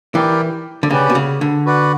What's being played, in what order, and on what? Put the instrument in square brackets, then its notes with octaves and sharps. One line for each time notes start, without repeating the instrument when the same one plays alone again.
[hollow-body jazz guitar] E3 [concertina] E4 G4 A#4 D5 G5
[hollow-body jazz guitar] D3
[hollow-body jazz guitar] C#3 [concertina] C#4 G4 B4 D5 F#5
[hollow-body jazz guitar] B2
C#3
D3
[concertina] F#4 B4 D5 F#5